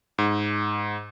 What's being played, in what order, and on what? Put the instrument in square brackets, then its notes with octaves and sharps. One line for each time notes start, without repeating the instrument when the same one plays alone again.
[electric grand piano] G#2